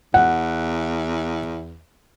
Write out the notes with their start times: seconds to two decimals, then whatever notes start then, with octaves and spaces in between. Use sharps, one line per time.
0.14 E2 F#5